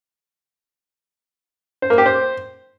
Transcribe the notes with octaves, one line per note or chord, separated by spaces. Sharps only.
C5
A#3
G4
C5